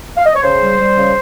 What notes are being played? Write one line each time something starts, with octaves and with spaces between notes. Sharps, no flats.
F5
D#5
C#5
C#3 C5
G3
G3
C#3